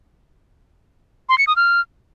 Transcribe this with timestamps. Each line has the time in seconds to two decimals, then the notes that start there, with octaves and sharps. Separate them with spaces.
1.29 C6
1.38 C#7
1.47 D#6
1.56 F6